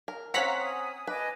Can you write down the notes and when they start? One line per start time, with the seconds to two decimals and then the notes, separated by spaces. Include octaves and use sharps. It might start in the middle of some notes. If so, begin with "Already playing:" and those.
0.08 A#4
0.34 C4 C#4 F5 F#5 A#5 B6
0.61 G#5 D#6
1.07 B4 D#5 G#5 D6